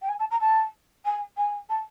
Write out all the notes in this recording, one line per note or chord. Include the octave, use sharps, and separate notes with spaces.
G5
G#5
A5
A#5
A5
G#5
G#5
A5